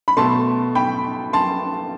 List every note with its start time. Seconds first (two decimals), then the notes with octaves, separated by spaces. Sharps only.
0.08 B5
0.17 B2 A3 A5 C6
0.75 G5 B5
1.33 A5 C6